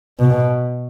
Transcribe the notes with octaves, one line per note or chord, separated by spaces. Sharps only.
B2